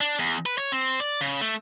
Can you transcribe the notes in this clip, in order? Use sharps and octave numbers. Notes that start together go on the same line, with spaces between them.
D4
E2
B4
C#5
C4
D5
C#3
A3